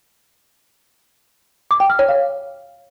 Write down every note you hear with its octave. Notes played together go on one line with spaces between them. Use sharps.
D6
G5
F6
C#5
F5